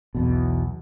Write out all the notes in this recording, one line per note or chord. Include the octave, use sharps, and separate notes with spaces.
B1 E2 B2